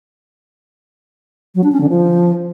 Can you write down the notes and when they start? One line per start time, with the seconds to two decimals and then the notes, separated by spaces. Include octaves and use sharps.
1.55 F#3
1.64 D4
1.72 C#4
1.81 D3
1.89 F3